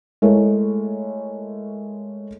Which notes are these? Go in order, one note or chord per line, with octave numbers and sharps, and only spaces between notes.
G#3 A3 E4 A#4 C#5